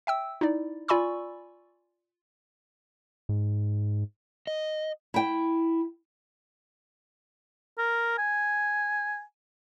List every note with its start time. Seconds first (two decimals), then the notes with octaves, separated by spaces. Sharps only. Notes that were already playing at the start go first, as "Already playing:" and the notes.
0.07 E5 G5 E6
0.41 D#4 E4 D5
0.88 F4 D5 G#5 B5 C#6 E6
3.29 G#2
4.47 D#5
5.14 E4 G5
7.78 A#4
8.18 G#5